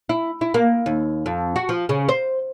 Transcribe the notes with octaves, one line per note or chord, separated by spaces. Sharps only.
E4
E4
A#3
D#2
F2
F#4
F3
C#3
C5